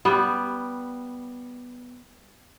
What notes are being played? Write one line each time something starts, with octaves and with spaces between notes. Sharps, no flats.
G3 B3